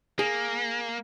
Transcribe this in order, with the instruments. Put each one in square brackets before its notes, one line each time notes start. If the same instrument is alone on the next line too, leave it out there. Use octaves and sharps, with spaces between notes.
[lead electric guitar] A#3 [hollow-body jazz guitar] G#4